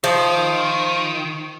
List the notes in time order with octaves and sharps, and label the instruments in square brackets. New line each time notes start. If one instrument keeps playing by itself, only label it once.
[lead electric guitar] D#3 [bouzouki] F3